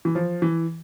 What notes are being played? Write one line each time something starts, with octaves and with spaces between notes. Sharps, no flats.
E3
F3
E3